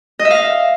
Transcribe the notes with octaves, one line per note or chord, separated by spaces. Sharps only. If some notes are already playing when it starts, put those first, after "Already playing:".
D#5
E5
F5